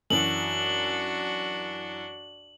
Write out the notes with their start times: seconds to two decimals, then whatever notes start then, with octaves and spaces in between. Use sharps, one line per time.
0.10 F#2 E3 D4 F#4 F#7